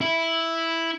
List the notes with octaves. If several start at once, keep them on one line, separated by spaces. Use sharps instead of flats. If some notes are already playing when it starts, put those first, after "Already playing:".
E4